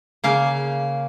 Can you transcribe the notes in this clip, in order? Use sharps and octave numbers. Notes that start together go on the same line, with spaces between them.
C#3 A#3 F5